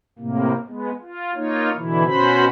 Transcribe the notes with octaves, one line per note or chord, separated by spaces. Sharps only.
A2 C3 A#3
G#3 B3
F4
A#3 D#4 F4 C#5
B2 D3 E3 E4
B2 C#4 F#4 C5 B5